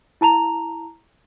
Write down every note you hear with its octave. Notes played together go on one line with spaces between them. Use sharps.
E4 A5 A#5 F7